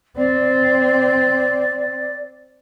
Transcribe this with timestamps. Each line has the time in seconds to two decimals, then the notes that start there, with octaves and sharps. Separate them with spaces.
0.17 C4 D5